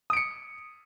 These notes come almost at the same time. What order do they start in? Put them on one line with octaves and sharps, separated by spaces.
D#6 D7 C#7